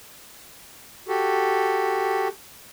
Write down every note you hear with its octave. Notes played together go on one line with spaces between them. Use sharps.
F#4 G4 A4